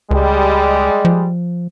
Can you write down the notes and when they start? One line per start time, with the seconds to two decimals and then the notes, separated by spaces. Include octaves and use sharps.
0.11 C#2 G3 G#3
1.05 F3